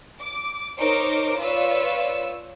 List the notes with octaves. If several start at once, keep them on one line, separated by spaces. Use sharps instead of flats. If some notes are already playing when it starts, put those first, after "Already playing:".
D6
D#4 A#4 C5 C#5 D6
F4 B4 C#5 D5 E6